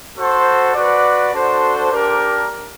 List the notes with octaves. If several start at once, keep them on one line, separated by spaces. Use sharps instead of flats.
F#4 A4 C5
F#4 B4 D5
D4 F#4 A4 C5
D4 G4 A#4